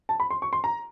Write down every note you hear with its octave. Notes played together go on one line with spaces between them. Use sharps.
A5
B5
C6
C#6
C6
A#5